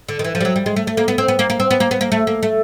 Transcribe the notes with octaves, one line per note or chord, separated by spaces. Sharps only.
D3
D#3
E3
F3
G3
F#3
G3
G#3
A3
A3
A#3
B3
C4
B3
A#3
A#3
C4
B3
A#3
B3
A#3
A3
A#3
A3